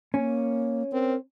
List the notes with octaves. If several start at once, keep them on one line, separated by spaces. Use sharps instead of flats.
A#3 C#4
C4 A#4